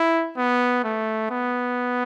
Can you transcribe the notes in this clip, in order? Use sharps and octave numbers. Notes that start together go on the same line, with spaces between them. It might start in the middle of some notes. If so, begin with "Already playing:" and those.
Already playing: E4
B3
A3
B3